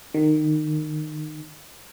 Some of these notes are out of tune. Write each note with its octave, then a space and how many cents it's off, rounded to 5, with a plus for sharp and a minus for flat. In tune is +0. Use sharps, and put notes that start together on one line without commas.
D#3 -20